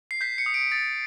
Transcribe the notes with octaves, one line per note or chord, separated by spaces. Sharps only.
C7
G6 B6
C#7
D#6
D7
D#6 A6